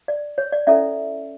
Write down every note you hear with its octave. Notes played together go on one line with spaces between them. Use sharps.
D5
C#5
D5
C#4 E4 A4 D5 E5